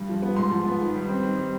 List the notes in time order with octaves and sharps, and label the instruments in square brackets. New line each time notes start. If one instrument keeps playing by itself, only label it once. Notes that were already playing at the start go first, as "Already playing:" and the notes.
Already playing: [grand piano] G2
F3
B3
G#2 C6
F3
B3
D#3
G3
C4
D#3
G3